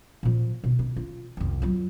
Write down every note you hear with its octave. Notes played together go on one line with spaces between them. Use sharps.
A#2 F3
B2
E4
F4
C2 F2
F#3 F4